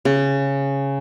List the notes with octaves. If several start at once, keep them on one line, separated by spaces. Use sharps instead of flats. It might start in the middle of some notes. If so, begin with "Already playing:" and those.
C#3